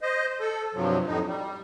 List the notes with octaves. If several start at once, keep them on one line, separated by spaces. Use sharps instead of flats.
C5 D#5
A4
G2 C3 F3 F#3
F2 A2 D#4
G3